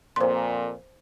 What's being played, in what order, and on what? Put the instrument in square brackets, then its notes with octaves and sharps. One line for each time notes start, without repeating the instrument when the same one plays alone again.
[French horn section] F2 A#2 [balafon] C5 C6